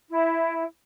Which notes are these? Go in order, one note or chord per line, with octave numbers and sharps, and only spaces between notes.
E4